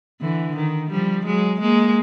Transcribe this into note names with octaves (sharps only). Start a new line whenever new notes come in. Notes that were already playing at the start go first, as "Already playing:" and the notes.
D3 E3
D#3
F3 G3
F#3 G#3
G#3 A#3